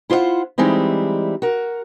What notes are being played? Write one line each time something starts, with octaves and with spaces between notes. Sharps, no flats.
E4 F4 C5 C#5 F#5
E3 G3 G#3 C4 D#4 E4
F#4 A#4